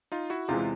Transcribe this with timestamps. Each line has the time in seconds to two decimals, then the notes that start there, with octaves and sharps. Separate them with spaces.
0.12 D#4 F4
0.30 E4 F#4
0.48 E2 C3 E3 G#3 F4 G4